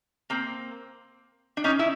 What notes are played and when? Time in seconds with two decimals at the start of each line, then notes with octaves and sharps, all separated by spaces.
0.30 A#3 C4
1.57 D4
1.64 C#4 D#4
1.79 E4